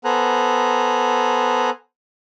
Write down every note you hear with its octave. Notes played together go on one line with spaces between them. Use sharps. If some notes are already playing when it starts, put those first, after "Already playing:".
B3 A4 C5 G#5 A#5 F#6